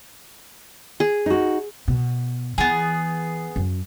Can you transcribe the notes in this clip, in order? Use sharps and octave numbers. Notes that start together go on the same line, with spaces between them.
G#4
D#4 F#4
B2
E3 B3 G#4
F#2